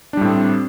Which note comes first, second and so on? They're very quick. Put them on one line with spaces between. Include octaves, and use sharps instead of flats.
D4 G3 A2 C4